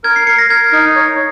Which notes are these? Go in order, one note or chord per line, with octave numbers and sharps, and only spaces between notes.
A#4 G#6
C7
A#4 C#7
A#6
A#4 G#6
D#4
C#5